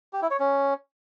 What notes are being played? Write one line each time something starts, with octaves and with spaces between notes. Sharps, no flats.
G4
E4
C#5
C#4